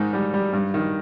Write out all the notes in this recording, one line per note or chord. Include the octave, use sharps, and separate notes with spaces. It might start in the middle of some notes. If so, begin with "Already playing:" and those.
Already playing: G#2 D#3 D#4
G3
G3
G2
D#3